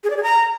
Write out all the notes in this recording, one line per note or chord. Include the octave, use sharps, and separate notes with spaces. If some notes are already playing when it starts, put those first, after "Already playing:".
G#4
D5
G#4
A#5